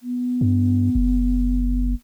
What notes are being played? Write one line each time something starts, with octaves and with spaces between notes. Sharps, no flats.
B3
G2
F#1